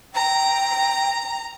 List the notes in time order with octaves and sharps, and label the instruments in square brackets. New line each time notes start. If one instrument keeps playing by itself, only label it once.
[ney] G5 [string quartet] A#5